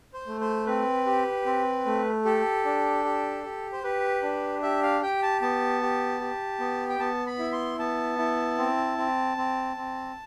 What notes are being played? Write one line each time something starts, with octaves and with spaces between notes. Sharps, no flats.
C5
A3
C5
C4 B4
G4
C4
A3
G4 A4
D4
G4
G4
C5
G4 B4
D4
G4 E5
F5
G4 G5
A5
B3 A5
G4
G4
B3
G5
B3 A5
B5
E4
C6
B3 A5
E4
C4
C4
C4
C4